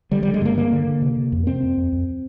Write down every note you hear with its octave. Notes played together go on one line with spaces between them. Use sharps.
D3 G3
D3 G3
G#3
G2 A#3
D3 A#3
D3
D3
C3
C3
F2
C3 C4
F2
F2
F2